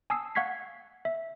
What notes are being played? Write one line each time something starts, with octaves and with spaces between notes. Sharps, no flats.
G#5 A5 D#6 E6 C7
F5 F#5 C#6 G#6 B6 C7
E5